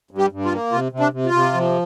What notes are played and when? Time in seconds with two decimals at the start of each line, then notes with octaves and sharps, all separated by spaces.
0.11 G2
0.18 G4
0.32 G2
0.45 F4
0.52 A#3
0.72 C3 F4
0.92 C3
1.00 D4
1.13 C3
1.26 F4
1.33 C3
1.53 F3